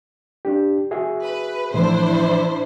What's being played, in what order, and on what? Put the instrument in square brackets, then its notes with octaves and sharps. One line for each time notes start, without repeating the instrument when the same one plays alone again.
[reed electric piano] D4 G4
F#4 G#4 E5
[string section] B4
[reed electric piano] A2 E3 F3 [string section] D4 E4 C5